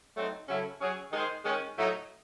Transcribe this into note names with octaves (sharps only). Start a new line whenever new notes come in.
F#3 A3 C4 D#4
C#3 F#3 C#4 E4 A4
F#3 C#4 G#4
D#3 G#3 D#4 G#4 C5
D#3 G#3 C#4
A2 F#3 A3 D#4